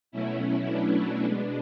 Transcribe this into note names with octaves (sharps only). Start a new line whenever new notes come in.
B2 F#3 A3 C#4 E4
B3 D4
B2 G#3